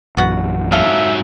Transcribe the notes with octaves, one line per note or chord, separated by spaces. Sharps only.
A#1 F#2 E3 B3 F#4 F#5
G#2 F#3 A4 E5 F5